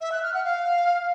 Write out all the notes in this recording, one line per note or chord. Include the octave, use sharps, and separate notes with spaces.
E5
F#6
F6
F#5
F5